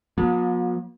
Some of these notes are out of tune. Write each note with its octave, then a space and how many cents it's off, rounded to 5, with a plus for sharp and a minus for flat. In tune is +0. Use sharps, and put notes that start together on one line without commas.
F3 +45 B3 -45